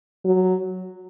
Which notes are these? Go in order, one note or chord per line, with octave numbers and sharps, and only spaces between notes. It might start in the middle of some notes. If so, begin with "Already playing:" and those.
F#3